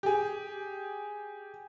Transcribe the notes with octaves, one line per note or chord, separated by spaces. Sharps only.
G4 G#4